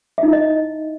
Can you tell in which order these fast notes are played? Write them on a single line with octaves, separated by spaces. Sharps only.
E5 D#4 E4 D#5